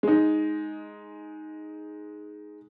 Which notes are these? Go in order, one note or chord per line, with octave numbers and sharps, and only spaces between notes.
G#3 D#4